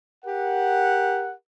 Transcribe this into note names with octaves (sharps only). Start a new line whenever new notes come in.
G4 A#4 F#5